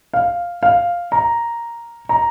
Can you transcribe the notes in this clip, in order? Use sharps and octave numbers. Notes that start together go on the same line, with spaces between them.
F5
F5
A#5
A#5